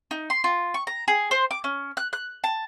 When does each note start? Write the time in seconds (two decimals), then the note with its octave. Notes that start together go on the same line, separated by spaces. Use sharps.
0.11 D#4
0.30 C6
0.44 F4
0.74 C#6
0.87 A#5
1.08 G#4
1.31 C5
1.51 D6
1.64 C#4
1.97 F#6
2.13 F#6
2.44 A5